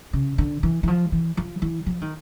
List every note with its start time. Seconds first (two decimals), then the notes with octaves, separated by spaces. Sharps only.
0.13 C#3
0.38 D3
0.63 E3
0.83 E3
0.88 F3
1.12 E3
1.37 F3
1.62 E3
1.86 F3
2.01 D#3